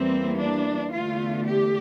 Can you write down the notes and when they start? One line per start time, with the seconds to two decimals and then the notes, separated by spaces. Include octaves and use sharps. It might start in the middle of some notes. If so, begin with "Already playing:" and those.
Already playing: E2 E3 G3 A#3 C4
0.39 D4
0.93 E2 D3 A3 F4
1.47 G4